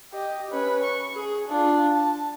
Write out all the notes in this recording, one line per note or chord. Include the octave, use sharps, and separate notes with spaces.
G4 D#5
C#4 B4
C#6
G#4
D4 F4
A5